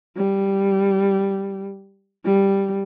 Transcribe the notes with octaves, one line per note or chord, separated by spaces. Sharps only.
G3
G3